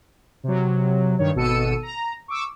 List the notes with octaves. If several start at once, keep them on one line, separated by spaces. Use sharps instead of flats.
C3 F#3
G2 D#3 C#5
G#1 B2 A4 E6 C#7 D#7
A#5
C#6 D6 E6